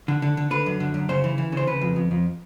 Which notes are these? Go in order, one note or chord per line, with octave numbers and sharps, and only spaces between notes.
D3
D3
D3
D3 B4
F#2
D3
F#2
C#3 C5
E3
E3
C#3 C5
C#3 B4
F2
F2
F2